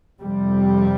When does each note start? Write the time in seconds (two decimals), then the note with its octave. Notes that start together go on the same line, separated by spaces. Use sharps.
0.22 F2 C3 G3